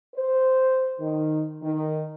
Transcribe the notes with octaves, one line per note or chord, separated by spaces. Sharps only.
C5
D#3
D#3